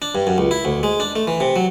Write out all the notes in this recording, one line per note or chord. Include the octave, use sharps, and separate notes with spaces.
D4
G2
F#2
C#2
E4
D2
G#3
D4
A3
E3
C3
F#3